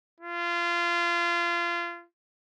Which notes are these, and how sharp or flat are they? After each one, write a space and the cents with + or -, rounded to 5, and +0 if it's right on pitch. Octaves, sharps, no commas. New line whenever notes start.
F4 -25